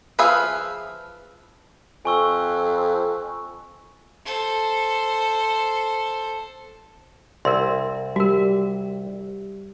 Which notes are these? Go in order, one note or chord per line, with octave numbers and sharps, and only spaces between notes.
F3 G#4 B4 E5 F5
F2 G#5 C#6 E6
A4 C5
C2 A#4 C6
G3 F#4 A#4